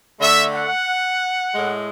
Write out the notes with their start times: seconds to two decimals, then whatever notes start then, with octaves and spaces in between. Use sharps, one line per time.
0.20 D3 A3 E5
0.53 F#5
1.54 A2 G#3